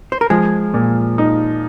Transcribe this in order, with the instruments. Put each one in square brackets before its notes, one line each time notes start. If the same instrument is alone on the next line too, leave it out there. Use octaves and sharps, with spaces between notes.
[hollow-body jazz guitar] C5
A#4
[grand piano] F3 [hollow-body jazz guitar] G#3 G#4
[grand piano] A#2
D#4